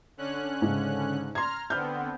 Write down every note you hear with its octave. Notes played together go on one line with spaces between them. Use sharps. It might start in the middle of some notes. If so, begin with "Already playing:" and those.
D3 C#4 F#6
G#2 C#3
A#5 C6 F6 G#6
D3 B3 C4 F6 G6